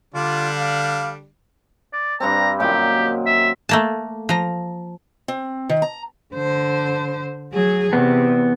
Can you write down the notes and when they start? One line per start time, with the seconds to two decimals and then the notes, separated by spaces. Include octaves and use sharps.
0.14 D3 G3 D4 F4
0.57 F5
1.93 D5
2.20 G2 G3 C4 A#5
2.60 F#2 A#2 D#3 G4
3.26 E5
3.69 A3 A#3 A5
4.29 F3 A#5
5.28 C4
5.69 D#3
5.82 A#5
6.34 D3 C5
7.53 F#3 G#4
7.93 E2 C3 B3